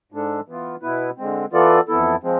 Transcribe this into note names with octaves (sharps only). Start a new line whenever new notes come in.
G#2 G#3 D4 A4
E3 B3 F4
B2 B3 E4 B4
D3 G#3 C4
E3 B3 F4 A4 D5
F2 E3 B3 E4 A4
F3 G#3 C4